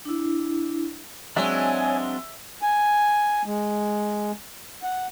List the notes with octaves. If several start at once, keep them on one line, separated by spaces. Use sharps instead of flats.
D4 E4
F#3 G#3 C4 D4 C#5 E5 G#5
G#5
G#3
F#5